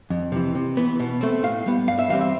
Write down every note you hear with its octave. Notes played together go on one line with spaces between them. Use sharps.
F2
C3 E3
C3
E3 B3
B2
A3 C4
A2 F5
G3 B3
G2 F5
E5
E3 G3 C4 F5
E5